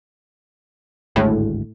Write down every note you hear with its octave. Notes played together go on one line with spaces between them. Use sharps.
G#1 D2 A2 G#3